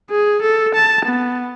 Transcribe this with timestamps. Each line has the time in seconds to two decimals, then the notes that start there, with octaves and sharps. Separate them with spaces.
0.11 G#4
0.42 A4
0.75 A5
1.05 B3